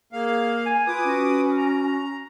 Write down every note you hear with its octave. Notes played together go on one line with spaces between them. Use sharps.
A#3 G#4 F5
G#5
F4 B4 D6 D#6
C#4 F#4
A#5